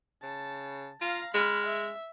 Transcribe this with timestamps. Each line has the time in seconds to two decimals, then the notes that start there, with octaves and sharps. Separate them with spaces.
0.23 C#3 A5
1.01 F4 F5 A#5
1.34 G#3 B5 F6
1.67 E5